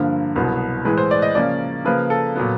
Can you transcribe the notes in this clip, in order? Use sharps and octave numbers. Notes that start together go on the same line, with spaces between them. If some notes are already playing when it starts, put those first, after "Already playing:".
Already playing: G2 D3 F3 A#3
C2 B2 F#3 B3
A2 E3 G#3 B4
C5
D5
D#5
C#3 F3 A#3 C#4 D5
C#3 F3 A#3 B4
A4
A#2 F#3 B3